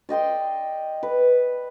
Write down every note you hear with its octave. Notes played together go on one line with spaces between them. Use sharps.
D5 D#5 G5 C6
B4